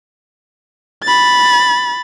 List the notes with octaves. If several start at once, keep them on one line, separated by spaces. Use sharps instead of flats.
B5 A6